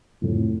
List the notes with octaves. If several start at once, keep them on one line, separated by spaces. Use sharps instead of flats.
F2 A2 C3 F3 A3